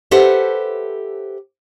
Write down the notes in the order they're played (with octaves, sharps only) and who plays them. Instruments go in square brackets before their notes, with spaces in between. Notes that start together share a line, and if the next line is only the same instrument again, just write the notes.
[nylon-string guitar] G4 A4 B4 C5 E5 F#5